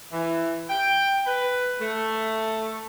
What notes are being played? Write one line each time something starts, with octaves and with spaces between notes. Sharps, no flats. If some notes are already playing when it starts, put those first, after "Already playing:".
E3
G5
B4
A3